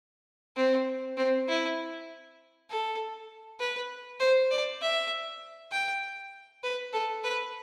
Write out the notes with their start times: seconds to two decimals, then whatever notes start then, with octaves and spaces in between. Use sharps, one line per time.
0.56 C4
1.17 C4
1.48 E4
2.70 A4
3.60 B4
4.20 C5
4.51 D5
4.81 E5
5.71 G5
6.63 B4
6.93 A4
7.23 B4